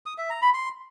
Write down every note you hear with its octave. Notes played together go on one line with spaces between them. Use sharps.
D#6
E5
A#5
B5
C6